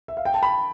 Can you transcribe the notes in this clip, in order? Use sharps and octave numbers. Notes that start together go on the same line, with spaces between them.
E5
F5
G5
A5
B5